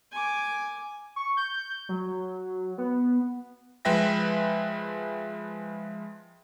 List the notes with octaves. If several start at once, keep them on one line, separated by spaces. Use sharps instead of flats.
G#5 D6
C#6
G6
F#3
B3
F3 G#3 B4 E5 G5 A#6